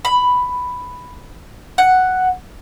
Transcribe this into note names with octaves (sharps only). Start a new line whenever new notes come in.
B5
F#5